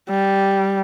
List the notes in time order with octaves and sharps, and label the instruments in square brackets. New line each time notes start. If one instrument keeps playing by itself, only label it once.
[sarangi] G3